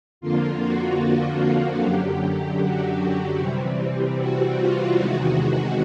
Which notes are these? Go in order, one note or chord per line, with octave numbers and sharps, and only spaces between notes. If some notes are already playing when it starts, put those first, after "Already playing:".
F2 D3 F3 A#3 F4
F#4
F#2 D3 F#3 G4
G4
F#4
C3 E3 G3 C4
F#4
F4
E2 C3 D#3 G#3 F#4